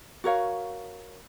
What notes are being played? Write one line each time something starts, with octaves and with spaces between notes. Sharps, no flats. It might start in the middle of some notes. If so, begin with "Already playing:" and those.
F#4 A#4 C#5 F5